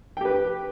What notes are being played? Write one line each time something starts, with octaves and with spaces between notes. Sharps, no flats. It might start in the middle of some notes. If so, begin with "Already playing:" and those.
G4 B4 G5